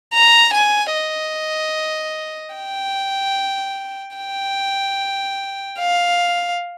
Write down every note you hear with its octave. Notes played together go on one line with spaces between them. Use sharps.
A#5
G#5
D#5
G5
G5
F5